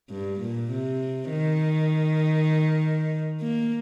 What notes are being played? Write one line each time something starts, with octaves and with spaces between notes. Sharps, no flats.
G2
A#2
C3
D#3
A#3